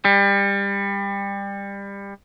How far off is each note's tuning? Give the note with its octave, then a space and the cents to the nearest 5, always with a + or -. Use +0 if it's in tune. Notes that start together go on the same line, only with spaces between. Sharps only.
G3 +25